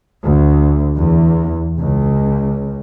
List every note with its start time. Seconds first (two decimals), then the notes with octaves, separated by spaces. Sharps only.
0.24 D2
0.98 E2
1.79 C#2